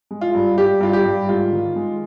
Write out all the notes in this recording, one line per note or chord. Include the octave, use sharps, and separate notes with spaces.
G#3
F4
G2
G2 G4
G2 F4
G4
G2
G#2 F4
D#3
G#3